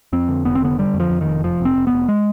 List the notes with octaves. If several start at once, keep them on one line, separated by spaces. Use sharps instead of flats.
F2 C4
D3
F1 B3
C4
D3 B3
D3 G3
F2
F3
F2
D#3
F1
F1 F3
F1
C4
F1
B3
F1
G#3